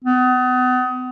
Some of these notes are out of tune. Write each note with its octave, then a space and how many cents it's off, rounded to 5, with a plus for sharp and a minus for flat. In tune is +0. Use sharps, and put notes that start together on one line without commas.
B3 +35